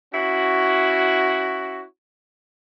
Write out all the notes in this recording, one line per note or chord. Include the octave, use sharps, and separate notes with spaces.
C#4 E4 F#4